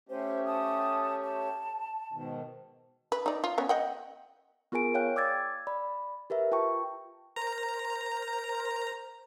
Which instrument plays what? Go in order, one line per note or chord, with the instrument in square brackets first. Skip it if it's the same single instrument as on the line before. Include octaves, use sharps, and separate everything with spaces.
[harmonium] A3 C#4 G4 [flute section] C5
[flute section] A5 D#6
A5
[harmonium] G#2 B2 D#3
[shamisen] B4
D#4 D5
F4
B3 C#4
D#5 F#5 G5
[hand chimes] B3 F4 G#4 A#4 G#5 D7
C#5 F5 G5 F#6
D5 D6 E6 G#6 A6
D5 B5
G4 A#4 B4 E5
F4 G5 A5 C#6
[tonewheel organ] A#4 C5 [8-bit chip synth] A#5